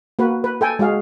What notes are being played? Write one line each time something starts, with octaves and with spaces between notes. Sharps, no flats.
A#3 F#4 B4
B4
A4 G5 G#5
G#3 F#4 G#4 F5